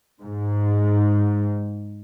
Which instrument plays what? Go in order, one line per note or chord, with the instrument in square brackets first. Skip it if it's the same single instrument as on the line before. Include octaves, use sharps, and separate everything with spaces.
[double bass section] G#2